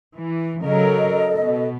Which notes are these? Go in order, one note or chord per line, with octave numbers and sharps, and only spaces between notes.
E3
C#3 F#3 A4 A#4 D#5
B2